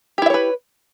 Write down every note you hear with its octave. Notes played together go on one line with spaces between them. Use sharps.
E4 G4 B4 C#5 E5